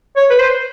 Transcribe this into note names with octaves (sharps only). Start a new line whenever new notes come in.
C#5
B4
C5